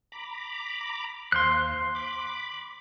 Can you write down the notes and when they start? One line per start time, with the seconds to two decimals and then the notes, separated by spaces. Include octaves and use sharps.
0.12 A#5 B5 D6
1.32 D#2 C5 F5 C6 F#6
1.95 B5 D6